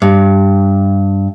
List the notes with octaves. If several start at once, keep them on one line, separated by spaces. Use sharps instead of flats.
G2